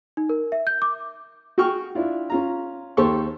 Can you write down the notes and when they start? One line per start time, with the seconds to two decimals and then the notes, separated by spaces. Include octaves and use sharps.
0.17 D#4
0.29 A#4
0.52 E5
0.67 G6
0.82 D6
1.58 F#4 G#4 G5 C#6 F6
1.95 D4 E4 F4
2.30 C#4 F4 A#5
2.97 D#2 G4 A4 C5 C6 C#6